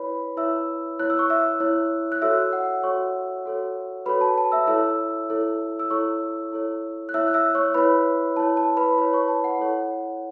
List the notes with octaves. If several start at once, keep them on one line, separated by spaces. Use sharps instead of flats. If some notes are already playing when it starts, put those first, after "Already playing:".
Already playing: E4 B4 C#5 B5
E4 C#5 E5 E6
E4 C#5 F#6
E6
C#6
E5 E6
E4 C#5
F#6
F#4 A4 C#5 E5 E6
F#5
F#4 A4 C#5 C#6
F#4 A4 C#5
F#4 A4 B4 C#5 B5
A5
A5
E5 E6
E4 A4 C#5 E5 E6
E4 A4 C#5
E6
E4 A4 C#5 C#6
E4 A4 C#5
F#6
E4 C#5 E5 E6
F#6
E5 E6
C#5 C#6
E4 B4 C#5 B5
E4 C#5 A5
A5
B4 B5
E4 B4 C#5 B5
C#5 C#6
A5
F#5
E4 A4 C#5